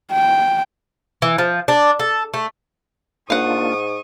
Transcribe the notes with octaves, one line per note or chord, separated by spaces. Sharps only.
G5
E3
F3
D4
A4
A3
G#2 A#3 D4 F4 F5 F#5 C#6 D#6